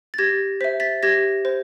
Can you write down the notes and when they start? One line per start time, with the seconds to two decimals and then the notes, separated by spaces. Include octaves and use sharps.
0.14 A6
0.18 G4 G#6 A#6
0.61 C5 E5 B6
0.80 A6 B6
1.03 G4 G#6 A#6
1.45 C5